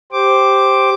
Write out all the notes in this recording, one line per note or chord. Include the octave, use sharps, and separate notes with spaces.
G4 C5 D6